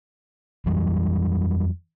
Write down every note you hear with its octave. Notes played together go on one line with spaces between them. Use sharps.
F2 E3 F#3 G3